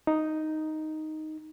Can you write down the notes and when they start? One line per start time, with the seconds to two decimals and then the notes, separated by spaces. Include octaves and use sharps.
0.07 D#4